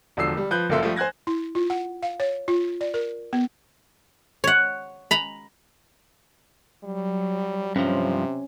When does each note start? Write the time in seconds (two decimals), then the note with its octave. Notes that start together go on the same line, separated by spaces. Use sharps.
0.17 E1 D3 F3 E6 C7
0.37 G3
0.51 F3 B4 F#6 G6
0.69 F#1 F3 A#3 A4 E5 C6
0.83 F3 G3 A3 G4
0.96 C5 G#5 F#6 G#6 A#6
1.27 E4
1.55 F4
1.70 F#5
2.03 F5
2.20 C#5
2.48 F4
2.81 D5
2.94 A#4
3.33 B3
4.44 C#5 F#5
5.11 A#5 B5
6.84 F#3 G3
7.76 G2 C3 F3 C#4